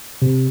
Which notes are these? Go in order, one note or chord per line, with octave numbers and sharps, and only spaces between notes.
C3